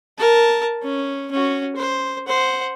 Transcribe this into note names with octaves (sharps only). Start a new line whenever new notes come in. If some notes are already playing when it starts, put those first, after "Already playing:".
A#4 A5
C#4
C#4 F#4
C5
C5 F#5